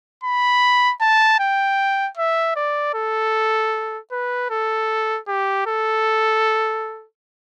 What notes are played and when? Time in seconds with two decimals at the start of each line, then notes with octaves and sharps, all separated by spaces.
0.23 B5
1.01 A5
1.40 G5
2.17 E5
2.56 D5
2.95 A4
4.12 B4
4.50 A4
5.28 G4
5.67 A4